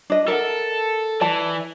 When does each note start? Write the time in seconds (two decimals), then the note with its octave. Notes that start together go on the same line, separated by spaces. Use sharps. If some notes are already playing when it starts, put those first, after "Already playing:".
0.10 D4 D#5
0.28 A4 A#4 E5 F#5
1.21 E3 D5 A5